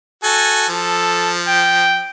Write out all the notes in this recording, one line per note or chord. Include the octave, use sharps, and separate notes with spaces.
F#4 A4 G#5
F3 A4
G5